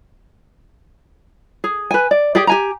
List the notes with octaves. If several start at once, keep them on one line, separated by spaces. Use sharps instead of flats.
G#4
B4 G#5
D5
G4 G#4 D5
G4 G#5 A#5